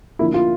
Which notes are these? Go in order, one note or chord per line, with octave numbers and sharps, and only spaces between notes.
D3 F3 A#3 E4
F4